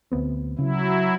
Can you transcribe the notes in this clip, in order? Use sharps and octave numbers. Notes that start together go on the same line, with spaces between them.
D2 B3 C4
C#3 F#3 E4